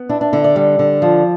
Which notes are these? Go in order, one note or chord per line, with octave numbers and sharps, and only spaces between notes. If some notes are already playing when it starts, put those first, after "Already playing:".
Already playing: B3
D4 E4
D4
D3 E4
D5
G3
D3
F3